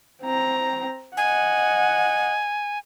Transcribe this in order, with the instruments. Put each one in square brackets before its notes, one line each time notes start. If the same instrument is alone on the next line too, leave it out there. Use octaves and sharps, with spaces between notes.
[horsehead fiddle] C4 A#5
[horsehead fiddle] D#5 F#5 [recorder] G#5